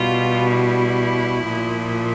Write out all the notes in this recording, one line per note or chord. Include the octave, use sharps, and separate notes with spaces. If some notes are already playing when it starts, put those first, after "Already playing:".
Already playing: B2 G3 F4
E4
A#2 F3